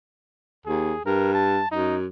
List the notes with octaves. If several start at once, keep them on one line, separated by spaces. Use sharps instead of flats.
D#2 G#4
G2 A#4
A5
F#2 D#4